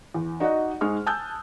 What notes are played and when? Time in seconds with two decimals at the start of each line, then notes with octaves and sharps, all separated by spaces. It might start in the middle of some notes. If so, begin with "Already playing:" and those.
0.14 E2
0.40 D#4 F#4 D5 D#5 F#5
0.81 G#2 G#3 G#4 C#6 F6
1.06 G#5 A5 D#6 E6 F#6 G6